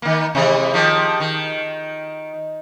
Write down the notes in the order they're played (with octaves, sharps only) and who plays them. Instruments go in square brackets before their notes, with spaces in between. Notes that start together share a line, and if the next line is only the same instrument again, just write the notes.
[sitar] D#3 A#3
C3 E3 G#3
D#3 F3 G4
D#3